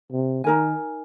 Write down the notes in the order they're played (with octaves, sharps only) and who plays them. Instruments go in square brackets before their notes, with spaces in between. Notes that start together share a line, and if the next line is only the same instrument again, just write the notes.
[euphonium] C3
[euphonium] D#3 [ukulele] D#4 A#4 G#5